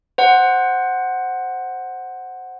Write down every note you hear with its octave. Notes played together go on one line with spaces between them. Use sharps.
C5 F#5